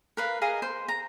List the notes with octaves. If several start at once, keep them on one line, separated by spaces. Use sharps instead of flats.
A#4 B4 F5
G#4 A#4 D#5 F5
C5
A#5